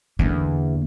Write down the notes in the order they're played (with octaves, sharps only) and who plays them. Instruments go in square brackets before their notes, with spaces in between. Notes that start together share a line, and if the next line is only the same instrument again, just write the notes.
[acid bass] E2 [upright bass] D3 A#3